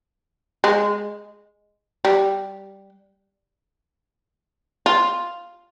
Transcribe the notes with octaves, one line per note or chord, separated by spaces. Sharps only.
G#3
G3
F4